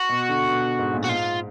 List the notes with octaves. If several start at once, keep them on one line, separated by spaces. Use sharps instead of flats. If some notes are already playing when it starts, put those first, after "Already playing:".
Already playing: F#4
B2
D3
B2
G#2
A#2
F#4
G#2 F4